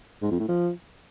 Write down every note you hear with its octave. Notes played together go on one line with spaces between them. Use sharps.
G#2
F2
A2
F3